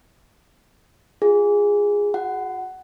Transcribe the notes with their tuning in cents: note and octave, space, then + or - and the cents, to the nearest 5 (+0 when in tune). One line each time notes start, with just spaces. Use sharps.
F4 +10 G#4 -15
F#4 -45 F#5 +10